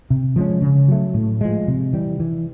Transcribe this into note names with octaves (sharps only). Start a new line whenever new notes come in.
C3
F3 G#3 C#4
C#3
F#3 A3
A2
F3 G#3
C3
E3 G3
E3